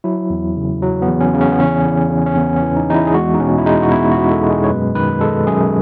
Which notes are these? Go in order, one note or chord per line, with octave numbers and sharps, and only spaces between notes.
F#3 E4
E2
C#3
F#3
B3
E2
C#4
C#3
C#4
B3
E2 C#4
E2
E2
C#4
E2 B3
C#4
E3
D#4
E2 D#4
E4
G#4
G#3 F#4
D#4
B2 C#4
E4
G#3 D#4
F#4
B2 E4
F#4
B2
A4
G#3
G#4
C#5
F#2 B4
D#3 B4
G#3 A4
F#2 G#4